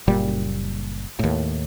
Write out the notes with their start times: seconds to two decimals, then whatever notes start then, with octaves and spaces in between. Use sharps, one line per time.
0.07 F#1 A#2 G3
1.19 D#2 A2